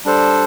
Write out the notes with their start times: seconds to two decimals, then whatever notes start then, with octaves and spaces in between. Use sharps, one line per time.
0.05 G3 D4 A4 C5